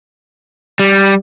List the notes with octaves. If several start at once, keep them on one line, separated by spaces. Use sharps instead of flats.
G3